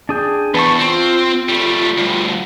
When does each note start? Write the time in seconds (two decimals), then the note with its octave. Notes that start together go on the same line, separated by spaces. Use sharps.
0.09 D4 G#4 G5
0.54 E2 B4 A5 C#6
0.79 C4 F4
1.49 G3 A3
1.98 D2 G2